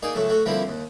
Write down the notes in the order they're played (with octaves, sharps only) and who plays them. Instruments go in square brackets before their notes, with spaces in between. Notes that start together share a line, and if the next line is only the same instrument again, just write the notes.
[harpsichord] A#3 D#4 G#4 D5
C#2 F#3 A3 A4 A5
A3 F#4 A4
D3 F3 G3 A#3 C4 E4
D#2